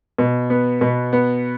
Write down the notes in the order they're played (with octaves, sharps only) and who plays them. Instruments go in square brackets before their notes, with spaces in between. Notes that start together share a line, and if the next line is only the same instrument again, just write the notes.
[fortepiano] B2
B3
B2
B3